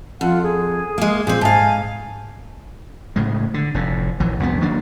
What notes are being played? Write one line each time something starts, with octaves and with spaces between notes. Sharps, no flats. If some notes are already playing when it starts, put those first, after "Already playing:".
F2 F4 F#5
G#4
G#3 A#3
A#2 C4
G#2 F5 G#5 A5
A2 C#3 G#3
D3
F1 A2
A#1 E3 F#3
C2 F2 G#3 B3
D#3 F#3 A#3 D4